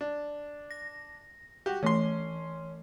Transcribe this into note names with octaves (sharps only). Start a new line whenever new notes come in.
D4
A#6
F#4 G4
E3 A3 C#4 C6